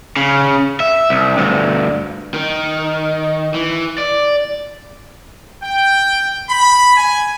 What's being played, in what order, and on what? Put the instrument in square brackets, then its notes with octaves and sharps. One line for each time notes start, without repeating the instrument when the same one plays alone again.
[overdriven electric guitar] C#3
E5
C2
D2 G2
D#3
E3
D5
[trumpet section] G5
B5
G#5